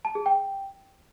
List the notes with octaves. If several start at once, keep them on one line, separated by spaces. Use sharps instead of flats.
A5
G#4
G5